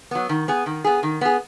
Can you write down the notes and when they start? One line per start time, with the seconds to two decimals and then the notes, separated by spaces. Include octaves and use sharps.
0.11 F#3 B3
0.29 D#3
0.48 B3 G#4
0.66 D#3
0.84 B3 G#4
1.03 D#3
1.21 B3 G#4